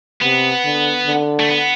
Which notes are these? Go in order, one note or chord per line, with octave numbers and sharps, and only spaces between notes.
C3 B3
D3
D3
A3
B3